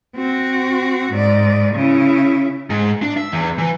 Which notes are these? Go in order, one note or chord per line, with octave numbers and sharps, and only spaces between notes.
C4 F#4
G#2 D5
C#3 E4
G#2
D4
E5
E2
E3